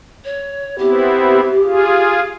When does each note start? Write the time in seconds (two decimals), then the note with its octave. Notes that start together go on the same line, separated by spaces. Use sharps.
0.25 C#5
0.78 B3 C4 E4 G4
1.63 F4 G#4